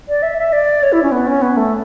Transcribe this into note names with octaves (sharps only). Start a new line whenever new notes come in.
D5
E5
E5
D5
C#5
E4
C#4
B3
C#4
B3
A3